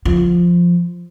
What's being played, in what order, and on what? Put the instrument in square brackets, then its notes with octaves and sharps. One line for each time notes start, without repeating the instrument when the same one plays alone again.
[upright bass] F3